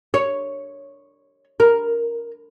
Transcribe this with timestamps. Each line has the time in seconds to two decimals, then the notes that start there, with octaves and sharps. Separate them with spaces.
0.14 C#5
1.60 A#4